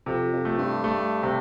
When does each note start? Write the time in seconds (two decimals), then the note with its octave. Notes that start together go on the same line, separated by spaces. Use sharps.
0.06 F2 C3
0.32 F2
0.45 A3
0.58 G2
0.84 A3
1.23 C3